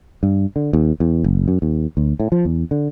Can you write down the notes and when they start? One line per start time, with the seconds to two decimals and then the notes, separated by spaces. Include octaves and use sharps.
0.23 G2
0.56 D3
0.73 D#2
1.00 E2
1.24 F#1
1.48 F#2
1.62 D#2
1.97 D2
2.20 A2
2.32 F3
2.45 E2
2.71 D3